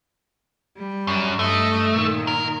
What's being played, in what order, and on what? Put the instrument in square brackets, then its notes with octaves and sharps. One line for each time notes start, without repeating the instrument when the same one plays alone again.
[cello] G3
[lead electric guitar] F#2
[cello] G2 D#5 [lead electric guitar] A3
[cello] A#2 D#3
[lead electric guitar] A#4